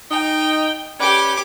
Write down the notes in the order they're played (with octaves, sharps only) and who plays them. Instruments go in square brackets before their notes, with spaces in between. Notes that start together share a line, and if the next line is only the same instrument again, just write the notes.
[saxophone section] D#4 [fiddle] G5
[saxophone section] C#4 B4 D5 [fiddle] G4 D6